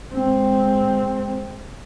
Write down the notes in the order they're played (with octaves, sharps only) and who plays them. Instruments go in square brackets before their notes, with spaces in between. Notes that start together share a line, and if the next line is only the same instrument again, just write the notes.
[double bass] G#3 C4